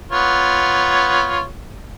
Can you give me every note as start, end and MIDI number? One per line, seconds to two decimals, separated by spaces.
0.11 1.47 59
0.11 1.47 65
0.11 1.47 73